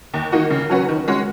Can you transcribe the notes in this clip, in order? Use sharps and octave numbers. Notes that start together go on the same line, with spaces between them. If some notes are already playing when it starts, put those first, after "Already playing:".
D#2
D#3 A#3 D#4 F#4
C#3
F#3 C#4 F#4 B4
D#3
G#3 C#4 F#4